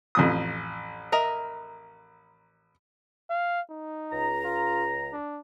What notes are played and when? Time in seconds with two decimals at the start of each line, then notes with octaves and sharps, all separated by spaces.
0.15 A1 F2 D#6
1.12 A#4 D#5 E5
3.30 F5
3.70 D#4
4.11 C#2 A#5
4.44 F4
5.13 D4